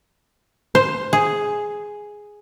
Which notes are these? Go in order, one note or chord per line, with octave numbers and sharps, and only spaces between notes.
C5
G#4